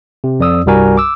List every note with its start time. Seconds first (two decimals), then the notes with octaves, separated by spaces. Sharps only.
0.24 C3
0.40 F2 D5 D#6 E6
0.66 C2 G2 G3 F#4 A#4 G#5
0.97 D6 E6